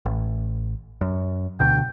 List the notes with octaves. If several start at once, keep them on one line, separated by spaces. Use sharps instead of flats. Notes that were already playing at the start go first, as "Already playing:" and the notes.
A1
F#2
D2 B2 D3 G5